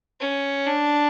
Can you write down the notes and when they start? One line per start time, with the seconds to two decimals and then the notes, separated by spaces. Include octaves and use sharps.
0.20 C#4
0.66 D4